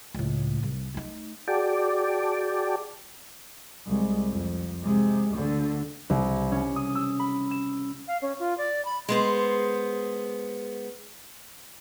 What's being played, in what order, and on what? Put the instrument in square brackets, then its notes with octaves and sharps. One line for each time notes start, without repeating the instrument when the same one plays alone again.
[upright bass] C#2 A2
C2
A3 D#4
[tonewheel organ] F#4 G#4 D5 G5 A5 D6
[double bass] C2 G#3
F2
C3 G#3
D2 D3
[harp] C2
C#4
D#6
E6
B5
E7
[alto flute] F5
C#4
F4
D5
B5
[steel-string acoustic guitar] G#3 B3 C5